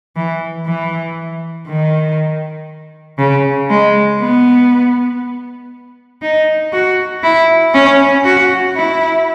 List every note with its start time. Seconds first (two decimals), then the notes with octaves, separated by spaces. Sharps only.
0.16 E3
0.67 E3
1.68 D#3
3.19 C#3
3.70 G#3
4.20 B3
6.22 D#4
6.73 F#4
7.23 E4
7.74 C#4
8.24 F#4
8.75 E4